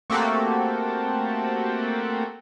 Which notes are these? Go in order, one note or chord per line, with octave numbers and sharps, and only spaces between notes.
A3 A#3 C4 F#4 G4 A4